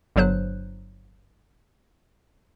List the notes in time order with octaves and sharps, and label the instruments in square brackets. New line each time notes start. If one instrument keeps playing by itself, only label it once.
[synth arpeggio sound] G1 G2 F#3 C5 F#6